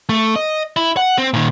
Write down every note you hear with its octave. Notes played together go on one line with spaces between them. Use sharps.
A3
D#5
E4
F#5
C4
A#2 D#3